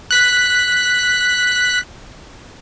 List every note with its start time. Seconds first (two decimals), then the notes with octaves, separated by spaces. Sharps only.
0.11 F#6 B6